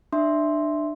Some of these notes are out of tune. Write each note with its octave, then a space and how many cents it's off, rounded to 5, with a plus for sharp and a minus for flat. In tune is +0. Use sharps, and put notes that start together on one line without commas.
D4 +25 E5 +0 C6 +0